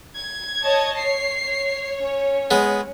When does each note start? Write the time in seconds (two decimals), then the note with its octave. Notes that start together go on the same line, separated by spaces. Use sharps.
0.16 G#6
0.63 C#5 D#5 A5
0.98 C#5 C7
1.48 C#5
1.99 C#4
2.51 G#3 B3